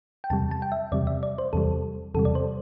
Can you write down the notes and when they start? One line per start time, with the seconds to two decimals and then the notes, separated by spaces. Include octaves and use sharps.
0.24 G5
0.30 E2 C3 G3 A5
0.51 A5
0.62 G5
0.72 E5
0.92 E2 C3 G3 D5
1.07 E5
1.23 D5
1.38 C5
1.53 E2 C3 G3 A4
2.14 E2 C3 G3 A4
2.25 D5
2.35 C5